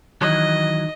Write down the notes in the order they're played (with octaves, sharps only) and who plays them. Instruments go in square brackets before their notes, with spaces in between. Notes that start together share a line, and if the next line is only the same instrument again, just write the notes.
[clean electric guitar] D#3 E3 F#3 [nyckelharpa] D#5